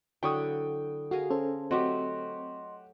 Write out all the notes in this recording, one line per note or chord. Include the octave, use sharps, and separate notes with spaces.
D3 F#3 E4 A4 G5 C#6 D#6
F#4 G#4 A#4 F5
C#4 A4 C5
F#3 A3 C4 F#4 G4 D#5 C6